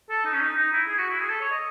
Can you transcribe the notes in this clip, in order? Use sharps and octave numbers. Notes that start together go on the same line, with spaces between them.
A4
D#4
C#4
D#4
D#4
E4
G#4
F#4
E4
G#4
A4
C#5
D#5